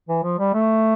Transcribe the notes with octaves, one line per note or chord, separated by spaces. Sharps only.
E3
F3
G3
A3